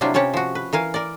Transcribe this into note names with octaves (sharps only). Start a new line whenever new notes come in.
C3 F#3 G3 D4 E4 F4
C3 C#4 G4 C#5 A5
F3 F#4
B4
E3 A#4 F5 G#5
A#4 D5